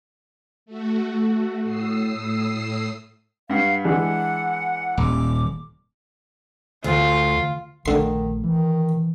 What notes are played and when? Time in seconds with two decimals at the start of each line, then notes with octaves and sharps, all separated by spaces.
0.66 A3 F#4
1.63 A2 D#6 E6 C7
3.50 G2 F5 F#5
3.85 E3 G#3 D4 F#5
4.97 D#1 D6
6.84 D2 F4
7.86 A#1 D3 D#3 A3 C6
8.44 D#3 E3